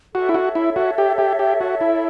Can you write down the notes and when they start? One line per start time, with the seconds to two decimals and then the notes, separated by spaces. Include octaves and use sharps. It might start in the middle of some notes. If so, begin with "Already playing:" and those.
0.14 F#4 A4 C#5 E5
0.29 E4
0.35 F#4
0.55 E4
0.76 F#4
0.98 G4
1.18 G4
1.39 G4
1.61 F#4
1.81 E4